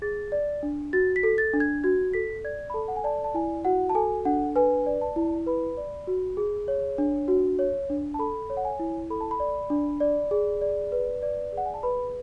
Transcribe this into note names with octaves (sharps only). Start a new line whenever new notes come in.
G#4 A6
D5
D4
F#4 A6
B6
A4
A6
D4
G#6
F#4 G#6
A4 B6
D5 G#6
B5
A4 A5
F#5
G#5
D5 A5
A5
E4 G#5
F#4 F#5
A5
A4 G#5
D4 F#5
B4 G#5
D5
A5
E4
B4 B5
D5
F#4
G#4
C#5
D4
F#4
C#5
D4
A5
A4 B5
C#5
F#5
G#5
E4
A4 B5
A5
B5
D5
D4
D5
G#4
D5
B4
D5
G#4
F#5
G#5
A5
B4 B5